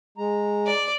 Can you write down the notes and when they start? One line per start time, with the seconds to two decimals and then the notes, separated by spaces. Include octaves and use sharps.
0.18 G#3 A#5
0.67 D5